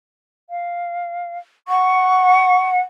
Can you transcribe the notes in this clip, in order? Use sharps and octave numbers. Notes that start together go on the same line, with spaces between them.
F5
F#5 C#6